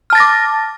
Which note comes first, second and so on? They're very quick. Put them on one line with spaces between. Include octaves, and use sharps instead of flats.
F6 A5 A6 A#6 D6